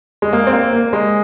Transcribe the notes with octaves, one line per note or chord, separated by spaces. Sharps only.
G#3
A#3
C4
A#3
A#3
G#3